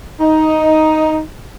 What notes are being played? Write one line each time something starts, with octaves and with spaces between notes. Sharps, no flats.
D#4